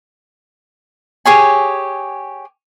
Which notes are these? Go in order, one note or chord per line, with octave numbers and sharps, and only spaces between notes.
G4 G#4 C#5 G#5